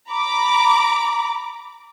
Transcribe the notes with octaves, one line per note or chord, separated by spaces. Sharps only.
A#5 B5 D6